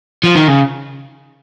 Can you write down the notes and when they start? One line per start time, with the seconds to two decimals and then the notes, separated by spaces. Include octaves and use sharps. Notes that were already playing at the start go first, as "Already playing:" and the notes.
0.24 F3
0.35 D#3
0.48 C#3